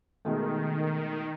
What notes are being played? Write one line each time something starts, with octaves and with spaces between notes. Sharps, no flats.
B2 D#3 G#3 A3